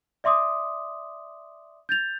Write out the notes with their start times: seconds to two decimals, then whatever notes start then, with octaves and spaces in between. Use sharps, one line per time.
0.24 D5 E5 C6 D6 D#6
1.89 G6 A6 F7